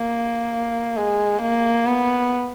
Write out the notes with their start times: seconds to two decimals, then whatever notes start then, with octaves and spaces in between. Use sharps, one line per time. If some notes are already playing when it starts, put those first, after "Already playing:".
Already playing: A#3
0.96 G#3
1.41 A#3
1.87 B3